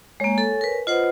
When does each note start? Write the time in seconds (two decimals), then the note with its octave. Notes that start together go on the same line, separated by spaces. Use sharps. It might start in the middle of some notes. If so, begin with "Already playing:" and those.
0.20 G#3 A#3 C#5 G#5
0.38 A4
0.61 A#4 B4
0.87 F4 B4 C5 D#5 F#5